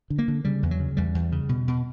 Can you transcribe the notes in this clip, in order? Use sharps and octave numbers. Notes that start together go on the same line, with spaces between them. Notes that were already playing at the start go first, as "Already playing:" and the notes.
D3
A#3
D3
C#3 G3
E2
F#3
C#3
E2 G3
E2
C#3
B2
B2